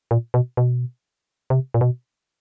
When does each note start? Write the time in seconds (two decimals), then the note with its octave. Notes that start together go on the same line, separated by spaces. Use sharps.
0.11 A#2
0.34 B2
0.57 B2
1.50 C3
1.74 A#2
1.81 B2